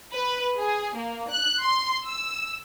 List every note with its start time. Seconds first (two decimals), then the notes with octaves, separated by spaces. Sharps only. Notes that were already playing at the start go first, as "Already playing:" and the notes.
0.13 B4
0.57 G#4
0.97 A#3
1.30 F#6
1.62 C6
2.06 E6